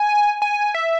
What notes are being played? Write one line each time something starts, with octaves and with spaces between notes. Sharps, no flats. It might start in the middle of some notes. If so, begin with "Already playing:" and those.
Already playing: G#5
G#5
E5